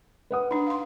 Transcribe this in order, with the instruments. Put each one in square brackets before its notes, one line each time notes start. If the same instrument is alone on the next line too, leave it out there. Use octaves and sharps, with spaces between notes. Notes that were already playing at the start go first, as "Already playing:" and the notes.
[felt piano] B4 F#5 D#6
[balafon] D4 D#4
F5 C6